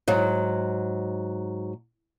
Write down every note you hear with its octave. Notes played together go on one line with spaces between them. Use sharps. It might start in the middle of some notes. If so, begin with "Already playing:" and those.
G#2 F#3